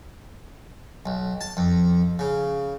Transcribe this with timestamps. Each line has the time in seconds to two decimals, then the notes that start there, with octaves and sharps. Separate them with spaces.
1.06 B1
1.41 A5
1.57 F2
2.19 C#3